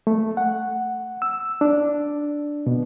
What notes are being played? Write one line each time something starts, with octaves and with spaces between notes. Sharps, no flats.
A3
F#5
E6
D4
B2